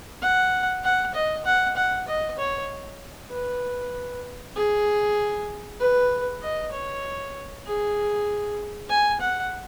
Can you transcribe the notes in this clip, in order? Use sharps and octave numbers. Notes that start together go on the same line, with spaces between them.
F#5
F#5
D#5
F#5
F#5
D#5
C#5
B4
G#4
B4
D#5
C#5
G#4
G#5
F#5